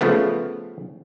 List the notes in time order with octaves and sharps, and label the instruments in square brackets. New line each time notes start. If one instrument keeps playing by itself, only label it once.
[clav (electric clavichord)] C#3 F3 A3 B3